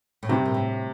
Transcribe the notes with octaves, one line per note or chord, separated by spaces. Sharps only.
A2
G2 C3
A#2
A2